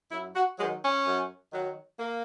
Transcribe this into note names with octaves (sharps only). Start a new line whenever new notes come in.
F#2 E4
F#4
D#3 F#3 G#3
C#4
F#2
D#3 F#3
A#3